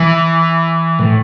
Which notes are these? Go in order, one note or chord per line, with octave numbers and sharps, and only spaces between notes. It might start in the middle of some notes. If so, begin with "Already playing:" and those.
Already playing: E3
A2